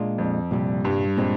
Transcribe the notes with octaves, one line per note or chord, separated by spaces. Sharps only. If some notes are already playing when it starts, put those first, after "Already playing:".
Already playing: A#2 G#3 D4 F4
F2
C2 A#2 G3
G2
A#2 G#3 C4